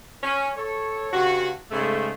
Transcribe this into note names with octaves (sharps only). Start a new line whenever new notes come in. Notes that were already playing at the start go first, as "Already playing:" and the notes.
C#4
A4 C#5
G2 C#3 F#4
G#2 C#3 A3